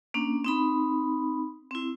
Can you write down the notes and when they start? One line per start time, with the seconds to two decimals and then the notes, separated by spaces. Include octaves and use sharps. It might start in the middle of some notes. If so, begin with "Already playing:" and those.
0.14 A#3 C#4 D4
0.44 C4 D#4 B5
1.71 C4 E4